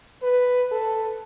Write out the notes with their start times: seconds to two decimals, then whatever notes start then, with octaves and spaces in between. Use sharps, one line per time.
0.23 B4
0.71 A4